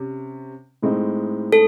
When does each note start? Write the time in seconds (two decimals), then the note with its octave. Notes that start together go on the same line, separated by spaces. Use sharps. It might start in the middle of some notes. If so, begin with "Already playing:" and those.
Already playing: C3 C#4
0.82 A2 G#3 C4 D#4
1.53 A4